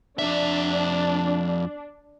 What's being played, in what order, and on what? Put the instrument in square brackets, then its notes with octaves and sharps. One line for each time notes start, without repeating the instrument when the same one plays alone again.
[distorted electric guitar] F2 E5 [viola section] D4